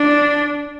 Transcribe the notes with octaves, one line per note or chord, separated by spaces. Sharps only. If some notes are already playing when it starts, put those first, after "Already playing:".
Already playing: D4